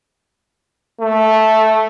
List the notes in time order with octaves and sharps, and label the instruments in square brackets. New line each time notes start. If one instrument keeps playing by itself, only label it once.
[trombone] A3